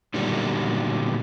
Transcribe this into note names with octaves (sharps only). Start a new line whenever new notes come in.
A#2 D3 D#3 F#3 G3 B3